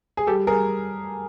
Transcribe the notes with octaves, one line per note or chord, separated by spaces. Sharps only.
G#4
G3 G4 A4
G#4 A#4